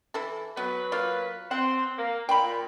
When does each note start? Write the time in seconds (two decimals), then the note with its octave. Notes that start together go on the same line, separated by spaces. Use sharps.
0.14 E3 A4
0.57 F#3 B3 B4
0.92 A#3 F4 F5
1.51 C4 C5 F#5
1.99 A#3
2.29 A#2 G5 B5